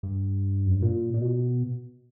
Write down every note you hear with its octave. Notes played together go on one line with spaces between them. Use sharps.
G2
F#2
G2
A#2
A#2
B2